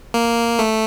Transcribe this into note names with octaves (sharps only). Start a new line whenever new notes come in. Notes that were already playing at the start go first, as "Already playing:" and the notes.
A#3
A3